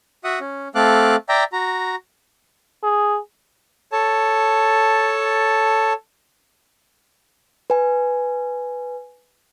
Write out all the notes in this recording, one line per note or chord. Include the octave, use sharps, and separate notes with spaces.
F#4 E5 F#5 D#6
C#4
A3 C4 A4 F5 D6 F#6
D5 E5 G5 A#5
F#4 A#5
G#4
A4 C#5 A5
B4 G#5